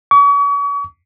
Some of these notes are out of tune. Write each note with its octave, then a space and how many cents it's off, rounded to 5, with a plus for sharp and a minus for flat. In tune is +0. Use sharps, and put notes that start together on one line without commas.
C#6 +40